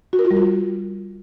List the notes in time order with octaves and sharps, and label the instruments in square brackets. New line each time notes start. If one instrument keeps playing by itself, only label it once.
[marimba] F#4
A#4
F4
G3
F#4